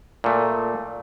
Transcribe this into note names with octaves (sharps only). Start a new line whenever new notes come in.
A#2 A3